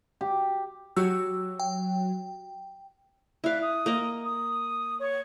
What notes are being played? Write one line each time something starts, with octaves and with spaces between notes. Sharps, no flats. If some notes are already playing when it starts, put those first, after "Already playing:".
G4
F#3 F#4 G4 C#5 E6
G5
E4 D5 E5 F5 F#6
D#6
A#3 A#4 D#5
D#6
C#5 C#6